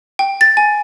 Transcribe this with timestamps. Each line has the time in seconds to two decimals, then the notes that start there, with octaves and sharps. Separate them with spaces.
0.19 G5
0.41 A6
0.57 G#5